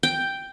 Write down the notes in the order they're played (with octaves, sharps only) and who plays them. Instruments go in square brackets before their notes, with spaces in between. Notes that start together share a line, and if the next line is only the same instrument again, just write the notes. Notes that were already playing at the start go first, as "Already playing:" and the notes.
[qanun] G5